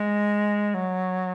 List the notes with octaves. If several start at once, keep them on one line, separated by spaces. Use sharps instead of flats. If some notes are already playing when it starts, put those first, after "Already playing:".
Already playing: G#3
F#3